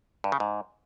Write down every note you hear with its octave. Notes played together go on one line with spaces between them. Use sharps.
G2
C#3
G#2